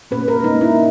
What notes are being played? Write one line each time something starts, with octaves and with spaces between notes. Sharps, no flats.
A#2 A#3 C#4 B4
A#4
A#2 A#3 C#4 D#4
E4